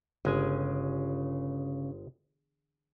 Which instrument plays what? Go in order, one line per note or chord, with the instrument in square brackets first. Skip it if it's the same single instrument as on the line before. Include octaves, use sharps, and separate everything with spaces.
[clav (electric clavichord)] G1 G#3 G#5 [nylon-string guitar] C#3